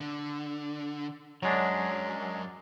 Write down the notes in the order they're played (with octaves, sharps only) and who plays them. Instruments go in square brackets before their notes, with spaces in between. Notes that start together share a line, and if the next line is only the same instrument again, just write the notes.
[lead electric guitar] D3
[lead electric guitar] F#2 [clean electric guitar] F#3 G#3 D4